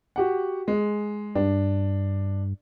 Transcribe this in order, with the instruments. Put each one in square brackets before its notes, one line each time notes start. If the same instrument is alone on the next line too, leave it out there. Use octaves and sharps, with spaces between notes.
[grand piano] F#4 G4 F#5
G#3
[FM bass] G2 [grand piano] D4